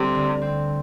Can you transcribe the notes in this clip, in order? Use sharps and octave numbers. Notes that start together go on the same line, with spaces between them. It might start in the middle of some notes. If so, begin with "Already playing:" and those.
Already playing: D2 C3 G3
D3
C4